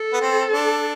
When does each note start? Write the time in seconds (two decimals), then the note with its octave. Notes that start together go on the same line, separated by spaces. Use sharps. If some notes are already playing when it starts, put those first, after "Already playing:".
Already playing: A4
0.13 B3
0.21 C4
0.52 D4